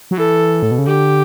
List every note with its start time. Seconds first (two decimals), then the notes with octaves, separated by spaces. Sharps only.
0.11 F#3
0.17 E3 A4
0.63 A2
0.71 B2
0.78 C#3
0.87 D3 G4